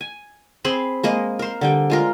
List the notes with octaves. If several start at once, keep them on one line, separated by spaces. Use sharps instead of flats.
G#5
C4 G#4 C5 B5
G#3 A#3 D#5
A#4 C5
D3 G3 G5
G#3 F4 A#4